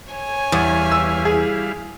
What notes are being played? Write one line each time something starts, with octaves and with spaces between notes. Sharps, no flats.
C#5 G#5
E2 G3 E4 F5
E6
G#4